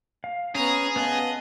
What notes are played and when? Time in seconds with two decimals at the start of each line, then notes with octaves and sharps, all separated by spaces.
0.24 F5
0.55 B3 C#4 G#4 A#5
0.96 B3 D#5 F5 A5